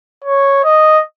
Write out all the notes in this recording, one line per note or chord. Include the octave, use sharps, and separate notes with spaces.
C#5
D#5